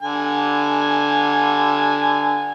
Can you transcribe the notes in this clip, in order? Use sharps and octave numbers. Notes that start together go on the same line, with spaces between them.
D3 G#5